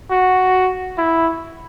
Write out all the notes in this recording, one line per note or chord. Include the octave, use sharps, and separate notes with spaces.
F#4
E4